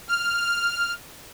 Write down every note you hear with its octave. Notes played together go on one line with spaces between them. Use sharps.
F6